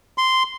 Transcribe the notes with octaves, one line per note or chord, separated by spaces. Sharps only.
C6